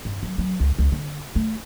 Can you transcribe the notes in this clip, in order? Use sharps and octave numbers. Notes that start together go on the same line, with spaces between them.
G2
F#3
F#3
C#2
C#2
D3
A3